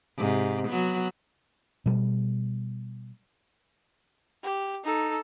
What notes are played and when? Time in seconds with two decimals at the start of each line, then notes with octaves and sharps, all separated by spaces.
0.17 G#2 C3
0.69 F#3 B3
1.86 B2 G3
4.43 G4
4.84 D#4 A4